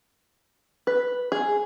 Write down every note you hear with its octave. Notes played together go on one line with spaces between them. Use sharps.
B4
G#4